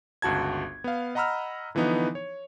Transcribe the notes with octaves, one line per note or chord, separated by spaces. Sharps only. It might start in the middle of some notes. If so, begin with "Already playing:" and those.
G1 C#2 F#4 A5 G#6
B3 F5
D#5 F#5 A#5 B5 E6 F6
D3 E3 F3 B3 D#4
C#5